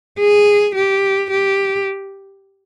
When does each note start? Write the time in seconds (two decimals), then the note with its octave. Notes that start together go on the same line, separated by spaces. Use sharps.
0.19 G#4
0.75 G4
1.30 G4